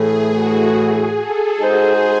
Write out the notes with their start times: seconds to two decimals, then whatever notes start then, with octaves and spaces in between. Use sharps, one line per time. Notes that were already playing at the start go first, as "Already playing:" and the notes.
Already playing: A2 E3 A3 G#4
0.32 F#4
0.75 G#4
1.17 A4
1.60 G#3 D#4 F#4 G#4 C5